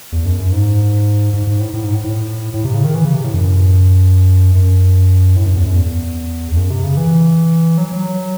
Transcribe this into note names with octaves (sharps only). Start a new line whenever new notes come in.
E2
F#2
F#2
G#2
G#2
G#2
A2
A2
G#2
A2
A2
A2
C3
C#3
D#3
E3
C#3
C3
A2
F#2
F#2
A2
F#2
E2
F#2
E2
E2
F#2
C3
C#3
E3
F#3
F#3